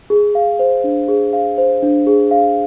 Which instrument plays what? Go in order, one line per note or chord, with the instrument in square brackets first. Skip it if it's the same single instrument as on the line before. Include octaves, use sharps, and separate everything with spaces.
[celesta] G#4
F5
C5
D4
G#4
F5
C5
D4
G#4
F5